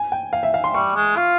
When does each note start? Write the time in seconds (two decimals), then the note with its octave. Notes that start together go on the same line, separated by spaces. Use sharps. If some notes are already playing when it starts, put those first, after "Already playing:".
Already playing: G#5
0.12 G5
0.33 F5
0.43 E5
0.54 F5
0.64 C6
0.74 G3 C#6
0.95 G#3
1.16 F4